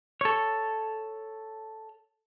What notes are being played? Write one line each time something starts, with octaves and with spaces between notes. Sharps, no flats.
A4 C#5